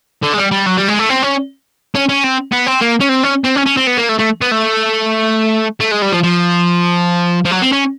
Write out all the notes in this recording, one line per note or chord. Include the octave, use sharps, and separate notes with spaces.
D3
G#3
G3
G3
F#3
G3
G#3
A3
C4
C#4
C#4
C#4
C4
B3
C4
A#3
C#4
C4
C#4
C4
C#4
C#4
C4
B3
A#3
A3
A3
B3
A3
A3
G#3
G3
F3
F3
F3
F#3
C4
C#4